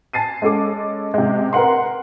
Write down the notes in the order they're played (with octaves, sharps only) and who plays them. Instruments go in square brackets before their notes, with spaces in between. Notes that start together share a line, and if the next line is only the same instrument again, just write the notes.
[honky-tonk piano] G#5 A5 A6 C7 D#7
G#3 C#4 A4 D6
C3 G#3
A#4 B4 F#5 C6